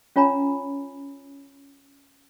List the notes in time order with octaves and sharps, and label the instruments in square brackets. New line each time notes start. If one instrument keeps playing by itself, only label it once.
[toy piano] C#4 F4 C#5 G#5 A#5 B5